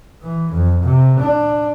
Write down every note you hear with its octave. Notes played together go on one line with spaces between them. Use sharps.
E3
F2
C3
D4